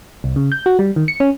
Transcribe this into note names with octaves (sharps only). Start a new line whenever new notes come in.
C2
C#3
G6
F#4
G3
D#3
C#7
C#4